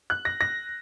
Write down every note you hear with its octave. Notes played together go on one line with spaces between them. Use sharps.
F#6
A#6
A#6